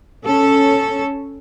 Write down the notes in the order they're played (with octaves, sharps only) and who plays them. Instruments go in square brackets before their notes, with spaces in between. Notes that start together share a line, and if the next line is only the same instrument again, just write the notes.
[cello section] C#4 A4